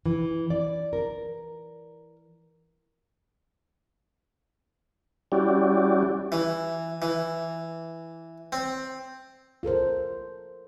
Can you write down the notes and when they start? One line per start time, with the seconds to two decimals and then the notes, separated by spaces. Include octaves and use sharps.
0.06 E3
0.50 D5
0.93 A#4
5.32 G3 C#4 E4 F#4 G4 D5
6.32 E3
7.02 E3
8.52 C4
9.63 F4 A4 A#4 C5